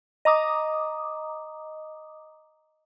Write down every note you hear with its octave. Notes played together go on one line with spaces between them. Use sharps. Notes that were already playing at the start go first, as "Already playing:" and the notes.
D#5 A#5 D6 D#6